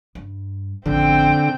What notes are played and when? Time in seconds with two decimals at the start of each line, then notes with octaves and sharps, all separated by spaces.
0.15 G2
0.86 A1 F2 D3 C4 G5